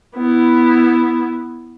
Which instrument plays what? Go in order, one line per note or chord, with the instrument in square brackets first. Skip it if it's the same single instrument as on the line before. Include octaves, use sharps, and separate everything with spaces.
[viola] B3 E4